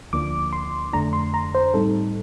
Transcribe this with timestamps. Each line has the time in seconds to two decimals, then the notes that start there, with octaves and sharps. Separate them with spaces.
0.13 D2 D3 F3 A#3 D4 D6
0.53 C6
0.93 F2 D3 A3 D4 A#5
1.13 C6
1.34 A#5
1.55 C5
1.74 A2 G3 C4 D#4 A4